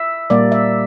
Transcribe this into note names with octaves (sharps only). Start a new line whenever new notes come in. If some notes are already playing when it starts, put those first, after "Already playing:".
Already playing: E5
A#2 G3 A#3 D5
E5